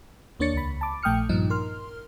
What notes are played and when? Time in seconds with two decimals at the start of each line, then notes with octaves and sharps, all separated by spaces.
0.39 D#2 A#3 D4 C#5 A6 C#7
0.53 C#2 B5
0.81 A5 D6
1.03 A#1 A3 G5 D#6 F6 C#7
1.29 G2 A#2 F3 D#4
1.50 A#4 C6 F6